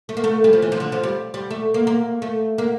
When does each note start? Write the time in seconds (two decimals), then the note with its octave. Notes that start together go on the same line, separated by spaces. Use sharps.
0.09 A3
0.17 A#3
0.24 A3
0.44 G3
0.53 F3
0.62 E3
0.72 F3
0.80 D3
0.92 F3
1.03 G3
1.34 G3
1.51 A3
1.74 A#3
1.87 A#3
2.22 A3
2.58 A#3